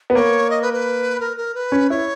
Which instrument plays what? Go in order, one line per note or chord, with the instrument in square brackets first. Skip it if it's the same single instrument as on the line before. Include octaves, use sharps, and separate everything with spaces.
[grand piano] B3
[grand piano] A#3 [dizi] C#5
[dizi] D#5
B4
B4
A#4
A#4
B4
[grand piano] C#4
[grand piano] E4 [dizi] C#5